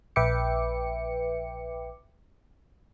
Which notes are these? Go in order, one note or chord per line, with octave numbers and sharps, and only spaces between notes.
A#1 B4 E5 G5 D6 C#7